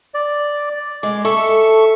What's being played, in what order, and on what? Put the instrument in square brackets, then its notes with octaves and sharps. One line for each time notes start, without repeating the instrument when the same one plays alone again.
[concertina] D5
[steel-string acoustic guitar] G#3 [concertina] D6
[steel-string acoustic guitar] A4 [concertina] E5 C#6